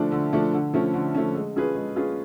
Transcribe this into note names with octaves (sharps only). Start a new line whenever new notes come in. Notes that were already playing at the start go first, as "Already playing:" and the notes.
Already playing: D3 F3 A3 D4
D3
F3 A3 D4
D3
F3 A3 C#4
D3
F3 A3 C#4
G#3
C#4 F4 G#4 B4
G#3
C#4 F4 G#4 B4